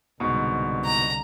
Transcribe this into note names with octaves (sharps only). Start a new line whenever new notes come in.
C2 G#2 B2 D3
A#5